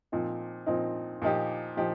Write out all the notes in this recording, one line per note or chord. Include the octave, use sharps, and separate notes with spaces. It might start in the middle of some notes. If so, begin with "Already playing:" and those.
A#2 F3 C4 D#4
A#2 F3 C4 D#4
A#2 F3 D#4 G4
A#2 F3 D#4 G4